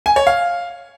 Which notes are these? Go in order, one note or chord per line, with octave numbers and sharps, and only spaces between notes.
G#5
C#5
F5